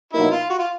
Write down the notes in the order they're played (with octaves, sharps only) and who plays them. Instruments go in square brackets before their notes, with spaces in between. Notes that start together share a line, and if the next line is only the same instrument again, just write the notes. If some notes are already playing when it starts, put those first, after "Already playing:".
[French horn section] B2 F#3 A#3 D#4 [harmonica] E4
[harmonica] F4
F#4
F4